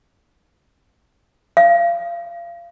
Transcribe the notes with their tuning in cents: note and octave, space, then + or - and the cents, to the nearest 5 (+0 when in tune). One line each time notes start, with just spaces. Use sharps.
F5 -30